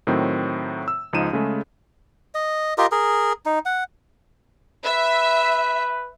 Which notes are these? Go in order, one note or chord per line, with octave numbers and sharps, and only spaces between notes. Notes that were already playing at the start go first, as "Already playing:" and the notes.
A2 D#3 F#3 C4
E6
C#2 F3 D#4 D#7 E7
C#3 G#3 A3
D#5
F4 G4 A#4 D#5
G#4 A#4
D#4
F#5
B4 E5